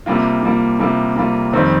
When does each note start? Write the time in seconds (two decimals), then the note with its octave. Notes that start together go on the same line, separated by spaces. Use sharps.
0.06 C3 G3 A#3 F4
0.43 C3 G3 A#3 F4
0.79 C3 G3 A#3 F4
1.16 C3 G3 A#3 F4
1.53 F2 D#3 G3 C4